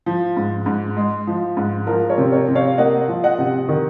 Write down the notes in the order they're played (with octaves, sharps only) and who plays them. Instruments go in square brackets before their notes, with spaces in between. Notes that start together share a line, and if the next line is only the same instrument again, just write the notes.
[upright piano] F3
G#2
G#2
G#3
F3
G#2
F3 A#4
A#4 C#5
C3
A#4 C#5
C3
C#5 F5
A#3 D#5 F#5
F3
D#5 F#5
C3
D#3